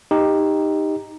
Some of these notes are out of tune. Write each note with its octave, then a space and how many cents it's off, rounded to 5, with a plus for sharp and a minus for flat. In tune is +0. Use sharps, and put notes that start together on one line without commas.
D#4 +0 G4 +15